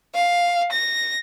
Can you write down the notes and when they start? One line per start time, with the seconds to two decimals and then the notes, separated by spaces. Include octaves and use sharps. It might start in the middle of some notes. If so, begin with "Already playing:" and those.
0.15 F5
0.72 A#6